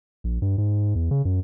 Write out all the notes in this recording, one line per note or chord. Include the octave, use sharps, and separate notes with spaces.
A#1
G2
G#2
E2
C#3
F#2